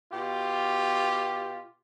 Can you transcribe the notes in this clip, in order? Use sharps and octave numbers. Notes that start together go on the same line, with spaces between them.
B2 F4 G4